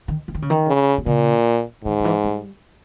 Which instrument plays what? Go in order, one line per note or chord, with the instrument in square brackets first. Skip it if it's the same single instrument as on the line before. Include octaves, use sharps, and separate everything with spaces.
[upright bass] D#3
E3
D#3
C#3
D#3
[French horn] C#3
[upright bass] B2
[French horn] A#2 [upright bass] C#3
[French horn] G#2 [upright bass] D#3
[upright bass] D#3
E3
G3